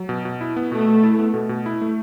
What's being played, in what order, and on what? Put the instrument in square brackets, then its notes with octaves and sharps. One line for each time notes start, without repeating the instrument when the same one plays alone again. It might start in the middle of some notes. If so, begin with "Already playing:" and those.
Already playing: [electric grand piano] F#3
B2
B2
E4
B3
[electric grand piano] B2 [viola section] A3
[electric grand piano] B2
E4
B3
B2
B2
E4
A3